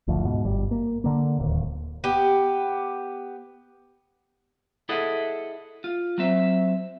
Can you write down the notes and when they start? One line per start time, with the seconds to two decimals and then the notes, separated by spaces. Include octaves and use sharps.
0.08 F#1 D2 F3
0.25 G#2 B2
0.45 G1 G3
0.71 A#3
1.04 D3 A#3
1.39 D1 D#2
2.04 B3 G4
4.89 E4 G#4 A4 D#5 E5 F#5
5.84 F4
6.18 F#3 C4 E5